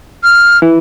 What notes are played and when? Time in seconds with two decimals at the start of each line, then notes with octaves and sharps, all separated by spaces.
0.24 F6
0.62 E3